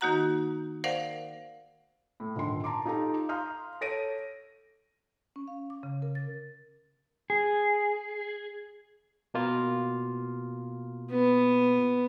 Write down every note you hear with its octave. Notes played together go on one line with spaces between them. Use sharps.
D#3 A#3 D#4 F#4 F#5 A#5
A#4 C5 D5 F5 F#5
A2
D#1 G#1 D3 C6
A5 A#5 C6 D6
D#4 F4 G4 A4 A#5
F5 A#5 C6 D#6 F6 G6
A4 C#5 A#6 D7 D#7
C#4
F5
D6
C#3
A#4
A6
G#4
B2 A#3 F4
B3